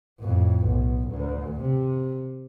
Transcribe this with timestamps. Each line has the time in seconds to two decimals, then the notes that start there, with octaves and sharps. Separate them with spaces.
0.20 F2 A2
0.67 B1
1.09 D2
1.62 C3